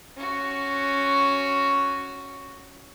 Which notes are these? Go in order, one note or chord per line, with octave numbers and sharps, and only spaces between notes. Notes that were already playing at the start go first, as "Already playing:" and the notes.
C#4 F#4